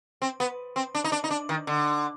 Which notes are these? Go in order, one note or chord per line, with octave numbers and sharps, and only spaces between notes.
C4
B3
C4
D4
D#4
D4
D#4
D4
D#3
D3